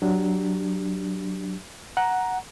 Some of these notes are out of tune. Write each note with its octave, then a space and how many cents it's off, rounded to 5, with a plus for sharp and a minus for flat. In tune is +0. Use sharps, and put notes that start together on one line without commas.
F#3 +10 D4 +0 G4 +0
F#5 +0 A#5 +10